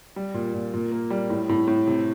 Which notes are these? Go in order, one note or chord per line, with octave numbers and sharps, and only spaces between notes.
G3
A#2
A#2
A#2
A#3
G3
A2
A2
A2
C3